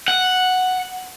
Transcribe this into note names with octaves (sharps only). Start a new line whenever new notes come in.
F#5